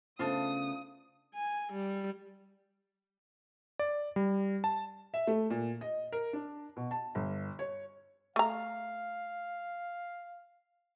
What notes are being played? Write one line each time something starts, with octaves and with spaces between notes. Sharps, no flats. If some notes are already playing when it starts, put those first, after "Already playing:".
C#3 A3 B3 D4 F4 C5 A5 D#6
G#5
G3
D5
G3
A5
E5
A3
A#2
D#5
A#4
D4
B2
A5
G1
C#5
A3 F5 A#5